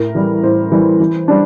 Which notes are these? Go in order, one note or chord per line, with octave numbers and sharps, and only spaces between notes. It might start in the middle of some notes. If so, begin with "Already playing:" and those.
Already playing: A2 A#4
E3 G3
A2 C5
E3 G3
E3
G3 D4